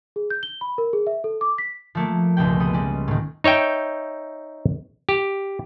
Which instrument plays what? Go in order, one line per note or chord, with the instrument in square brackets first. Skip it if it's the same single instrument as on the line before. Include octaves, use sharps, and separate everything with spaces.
[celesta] G#4
G6
G7
B5
A#4
G#4
E5
A4
D6
B6
[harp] F3 A3 A#3
G1 C#2 B2 G3 G5
G3 B3 D#6
G3 G#3 C#4
A2 D#3
[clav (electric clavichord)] D#4 C#5 E5 G5
G4